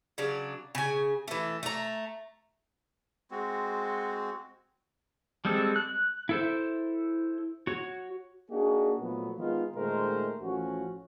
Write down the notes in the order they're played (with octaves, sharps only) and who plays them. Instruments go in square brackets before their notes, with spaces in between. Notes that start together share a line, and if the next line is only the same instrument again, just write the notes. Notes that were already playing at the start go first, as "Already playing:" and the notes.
[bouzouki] C#3 F#3 D4
C#3 G#5
E3 A3
A3 A#5
[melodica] G#3 C4 F#4
[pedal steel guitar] G3 G#3 C4 A4
F#6
E4 A4 C5
F#4 C#5
[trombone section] A#3 D4 D#4 F#4 G#4
A#2 F3 F#3 A3 B3
D#3 G#3 B3 D#4 F4
A#2 D#3 G#3 A3 A#4 C5
A1 F3 C#4 F#4